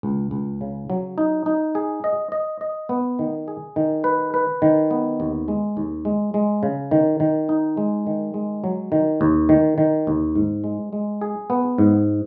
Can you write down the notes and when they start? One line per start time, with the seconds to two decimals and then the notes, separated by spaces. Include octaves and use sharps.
0.03 C#2
0.31 C#2
0.61 C#3
0.90 F#3
1.18 D#4
1.46 D#4
1.75 G#4
2.04 D#5
2.32 D#5
2.61 D#5
2.89 B3
3.19 D#3
3.48 G#4
3.76 D#3
4.04 B4
4.34 B4
4.62 D#3
4.91 B3
5.20 D#2
5.48 G#3
5.77 D#2
6.05 G#3
6.34 G#3
6.63 C#3
6.91 D#3
7.20 D#3
7.49 D#4
7.77 G#3
8.07 D#3
8.34 G#3
8.64 F#3
8.92 D#3
9.21 D#2
9.49 D#3
9.78 D#3
10.07 D#2
10.36 G#2
10.64 G#3
10.93 G#3
11.21 G#4
11.50 B3
11.78 G#2